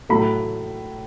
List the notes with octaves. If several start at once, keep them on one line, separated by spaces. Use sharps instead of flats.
A2 F#3 A3 B5